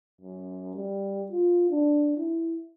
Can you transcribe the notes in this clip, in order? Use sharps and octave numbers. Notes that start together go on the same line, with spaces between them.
F#2
G3
F4
D4
E4